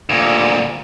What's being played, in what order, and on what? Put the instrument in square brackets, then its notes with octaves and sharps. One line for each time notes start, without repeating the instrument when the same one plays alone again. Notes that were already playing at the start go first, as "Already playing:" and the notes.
[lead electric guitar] D2 A#2